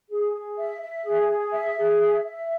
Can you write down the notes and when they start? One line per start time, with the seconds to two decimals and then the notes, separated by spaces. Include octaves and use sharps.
0.09 G#4
0.34 G#4
0.57 E5
0.81 E5
1.04 G#4
1.28 G#4
1.52 E5
1.76 G#4
1.99 E5
2.24 E5